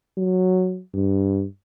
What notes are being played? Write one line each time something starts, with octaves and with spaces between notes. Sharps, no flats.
F#3
G2